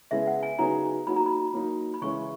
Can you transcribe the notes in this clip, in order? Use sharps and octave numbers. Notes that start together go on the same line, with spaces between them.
C#3 G#3 B3 E4 G#4 E5
F#5
G#5
C#3 F#3 B3 D#4 G#4 A#5
F#3 A#3 D#4 F#4 B5
A#5
B5
F#3 A#3 D#4
B5
C#3 E3 G#3 C#4 E4 C#6